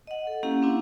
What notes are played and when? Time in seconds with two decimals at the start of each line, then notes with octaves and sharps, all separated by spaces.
0.07 D#5 F#5
0.27 A4
0.43 A#3 C#4 E4 G4 F5 F#5
0.62 A#3 C4 D4 E4